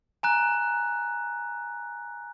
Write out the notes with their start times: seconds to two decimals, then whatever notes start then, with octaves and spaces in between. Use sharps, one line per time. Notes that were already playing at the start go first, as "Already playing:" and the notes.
0.23 G#5 A#5 F#6